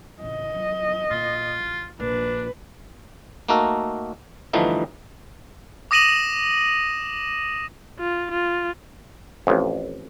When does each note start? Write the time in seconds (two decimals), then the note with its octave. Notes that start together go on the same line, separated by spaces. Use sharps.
0.21 A1 C#3 D#5
0.55 F#3
1.11 A#2 F4
1.60 A1
2.00 A#1 D4 B4
3.48 A3 A#3 D#4 F#4 A4 A#4
4.53 G2 D3 E3 F3 A3 D#4
5.91 D6 D#6 A#6 D#7 E7 F#7
7.99 F4
8.31 F4
9.47 A1 F2